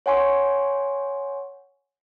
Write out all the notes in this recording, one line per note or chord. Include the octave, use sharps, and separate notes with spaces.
C#5 F#5 G#5 C6 C#6